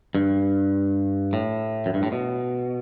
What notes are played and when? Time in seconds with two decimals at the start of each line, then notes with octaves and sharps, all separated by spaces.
0.15 G2
1.33 A2
1.86 F#2
1.94 G2
2.03 A2
2.12 B2